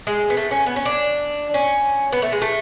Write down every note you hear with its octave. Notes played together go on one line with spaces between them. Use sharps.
G#3
B3
A3
C#4
B3
C#4
D4
C#4
B3
A3
G#3
A3